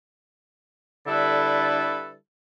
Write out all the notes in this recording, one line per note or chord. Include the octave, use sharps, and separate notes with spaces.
D3 G3 D4 E4 A4 B4